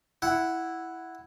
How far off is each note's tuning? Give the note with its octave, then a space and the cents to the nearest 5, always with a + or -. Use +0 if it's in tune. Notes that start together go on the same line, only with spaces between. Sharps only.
E4 +0 F#5 +0